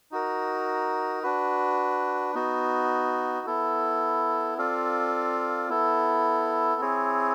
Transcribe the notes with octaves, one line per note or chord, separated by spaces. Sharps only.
D#4 F#4 A#4
D4 F#4 B4
B3 D#4 F#4
B3 E4 A4
C4 F4 A4 D5 F5
B3 E4 A4
C4 E4 G#4 C#5